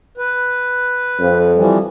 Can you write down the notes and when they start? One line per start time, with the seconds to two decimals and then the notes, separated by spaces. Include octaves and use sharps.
0.18 B4
1.20 F2
1.54 E3 F3 G3